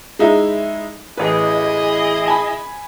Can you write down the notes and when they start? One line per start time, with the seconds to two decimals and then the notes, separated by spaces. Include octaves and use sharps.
0.19 G#3 D#4 E4
1.17 A1 E4 G#4 B4 D#5
2.28 G#5 B5